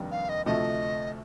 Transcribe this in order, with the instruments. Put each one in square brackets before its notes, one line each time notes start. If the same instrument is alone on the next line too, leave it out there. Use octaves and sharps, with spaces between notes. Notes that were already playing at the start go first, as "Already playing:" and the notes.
Already playing: [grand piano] F1 D#2 D#3 G3 D4
[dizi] F5
D#5
[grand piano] D2 C3 F3 A3 [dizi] D#5